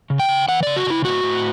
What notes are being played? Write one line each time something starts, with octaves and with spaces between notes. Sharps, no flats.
C#3
G5
C#3
E3 F#5
C#3 D5
F#4
C#3 E4
A2 F#4
A2